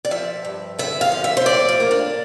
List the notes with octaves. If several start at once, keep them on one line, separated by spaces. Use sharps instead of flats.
D5
F3 E5
G2
D3 E5
F5
F3
E5
C5
A2 D5
F4
A#3
D4